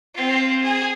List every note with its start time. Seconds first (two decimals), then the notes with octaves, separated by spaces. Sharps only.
0.15 C4 F4
0.63 G#4